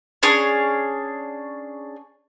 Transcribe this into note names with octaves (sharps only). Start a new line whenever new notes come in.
C#4 D4 G#4 C#5